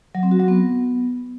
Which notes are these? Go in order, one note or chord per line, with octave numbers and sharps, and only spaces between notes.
F#3
C4
F#4
F#3
B3